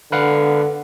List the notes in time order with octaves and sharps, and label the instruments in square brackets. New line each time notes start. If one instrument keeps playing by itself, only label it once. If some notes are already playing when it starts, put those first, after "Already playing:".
[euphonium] D3 [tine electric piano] B4 F5 F#5